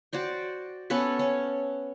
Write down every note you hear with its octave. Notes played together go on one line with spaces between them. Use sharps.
F#4 C5 D5 G5
B3 C#4 A4 B4
C#4